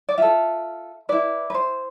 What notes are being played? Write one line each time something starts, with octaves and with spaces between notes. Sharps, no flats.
D5
F4 A4 E5
E4 B4 D5
B4
C5